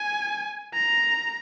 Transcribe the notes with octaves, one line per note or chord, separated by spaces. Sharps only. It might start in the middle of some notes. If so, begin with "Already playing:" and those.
Already playing: G#5
A#5